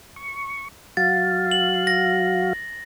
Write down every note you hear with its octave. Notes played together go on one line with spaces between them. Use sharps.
C#6
F#3 F#4 F5 A6
F#7
A#6